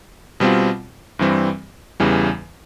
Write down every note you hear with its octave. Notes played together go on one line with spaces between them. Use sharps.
B2 G3 C4 F4
G2 E3 G3 C4
E2 C#3 E3 G3